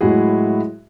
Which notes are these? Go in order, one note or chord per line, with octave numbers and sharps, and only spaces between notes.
A2 F#3 G#3 E4 F#4 G#4